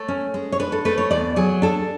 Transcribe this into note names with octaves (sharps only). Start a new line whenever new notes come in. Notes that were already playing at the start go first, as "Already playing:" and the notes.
Already playing: A3 C#5
C#4
G#3
C#5
D4 B4
A4
A3 B4
C#5
E2 D5
F#3 G#4
D4 A4